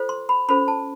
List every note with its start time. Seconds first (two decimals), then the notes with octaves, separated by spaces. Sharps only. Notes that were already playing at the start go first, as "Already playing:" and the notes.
Already playing: F4 A4 C5
0.09 C6
0.29 B5
0.49 C#4 F4 A4 C5 B5
0.68 A5